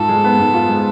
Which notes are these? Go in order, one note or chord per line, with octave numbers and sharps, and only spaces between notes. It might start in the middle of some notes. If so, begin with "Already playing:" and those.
Already playing: G#2 F4 A4
G#3
B3
G#2
F4
G#3